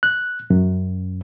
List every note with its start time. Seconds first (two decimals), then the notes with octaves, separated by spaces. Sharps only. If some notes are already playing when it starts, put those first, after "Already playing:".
0.03 F#6
0.50 F#2